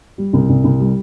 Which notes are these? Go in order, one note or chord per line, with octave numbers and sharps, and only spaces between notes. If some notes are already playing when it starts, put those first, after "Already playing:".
G3
C2
C2
C2
G3